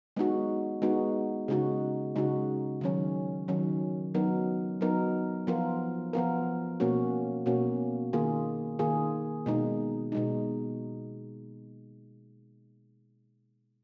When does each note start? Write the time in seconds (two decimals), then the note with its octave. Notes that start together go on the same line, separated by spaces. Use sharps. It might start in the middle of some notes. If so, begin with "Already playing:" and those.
0.17 G#3 B3 D#4 F#4
0.82 G#3 B3 D#4 F#4
1.48 C#3 G#3 D#4 F#4
2.16 C#3 G#3 D#4 F#4
2.81 D#3 F#3 C#4
3.48 D#3 F#3 C#4
4.14 F#3 B3 D#4 A#4
4.81 F#3 B3 D#4 A#4
5.47 F3 B3 F4 A#4
6.13 F3 B3 F4 A#4
6.80 B2 A#3 C#4 F#4
7.46 B2 A#3 C#4 F#4
8.13 D#3 A#3 F4 G#4
8.79 D#3 A#3 F4 G#4
9.46 B2 G#3 D#4
10.12 B2 G#3 D#4